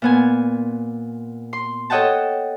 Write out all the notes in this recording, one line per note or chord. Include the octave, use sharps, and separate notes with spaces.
A#2 B3 G#5
C6
A4 C#5 D#5 F#5 G5 A5